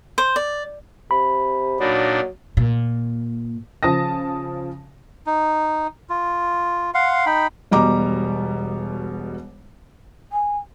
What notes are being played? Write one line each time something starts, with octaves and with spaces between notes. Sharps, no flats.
C5
D5
C3 B5
A#2 F#3 D4 D#4
A#2
C#3 F3 A5 D#6 A#6
D#4
F4
F5 F#5 C6
D#4 G5 B5
E1 B2 G3 D#5 A#5 D6
G#5